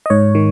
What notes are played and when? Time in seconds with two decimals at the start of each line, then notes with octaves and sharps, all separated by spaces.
0.06 D#5
0.10 G#2 C#5
0.35 D#3